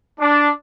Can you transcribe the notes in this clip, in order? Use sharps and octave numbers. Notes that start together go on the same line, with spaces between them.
D4